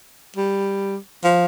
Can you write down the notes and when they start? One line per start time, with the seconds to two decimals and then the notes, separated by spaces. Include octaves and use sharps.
0.36 G3
1.24 F3